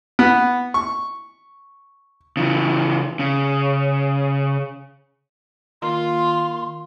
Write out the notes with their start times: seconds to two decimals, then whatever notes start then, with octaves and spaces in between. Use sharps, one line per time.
0.19 B3
0.74 C#6
2.37 C#3 E3
3.19 C#3
5.82 D#3 A#3 F4 C6